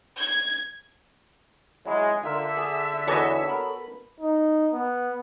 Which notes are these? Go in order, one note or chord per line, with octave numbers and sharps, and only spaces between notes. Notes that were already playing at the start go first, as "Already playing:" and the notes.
G#6
F#3 G#3 E4
D3 F4 A#4 E5
G#4
E2 E3 F#4 A4 C#5 D#5
B3 A#4 B5
D#4
B3